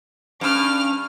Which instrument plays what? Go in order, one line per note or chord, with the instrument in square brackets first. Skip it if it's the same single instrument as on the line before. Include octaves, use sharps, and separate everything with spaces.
[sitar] G2 [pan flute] C#4 [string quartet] D6 F6